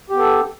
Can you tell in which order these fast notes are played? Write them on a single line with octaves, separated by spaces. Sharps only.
G4 B3 A4